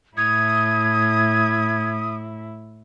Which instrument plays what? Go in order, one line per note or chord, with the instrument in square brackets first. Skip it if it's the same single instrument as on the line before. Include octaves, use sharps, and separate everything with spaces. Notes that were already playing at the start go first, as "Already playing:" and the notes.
[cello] A2 E4 [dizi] D#6 [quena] G#6